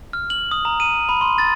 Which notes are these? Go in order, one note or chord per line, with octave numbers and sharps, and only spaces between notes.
F6
F#7
D#6
A#5
D#7
B5
C6
A6